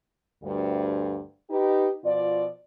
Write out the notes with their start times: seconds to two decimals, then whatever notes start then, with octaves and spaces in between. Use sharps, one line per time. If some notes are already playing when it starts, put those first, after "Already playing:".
0.43 D2 G2
1.50 D#4 G4 B4
2.05 B2 F3 F4 D5